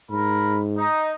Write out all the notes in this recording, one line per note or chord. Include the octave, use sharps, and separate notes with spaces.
G#2 A#4 B5
D#4